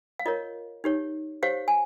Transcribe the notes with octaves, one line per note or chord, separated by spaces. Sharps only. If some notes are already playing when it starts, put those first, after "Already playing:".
F5
F4 A#4 C#5 D#5
D#4 G4 C#5
G4 C5 C#5 F5
G#5